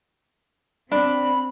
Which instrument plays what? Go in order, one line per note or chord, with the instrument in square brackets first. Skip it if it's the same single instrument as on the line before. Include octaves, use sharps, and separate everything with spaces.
[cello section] C4 [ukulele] D4 [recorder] B5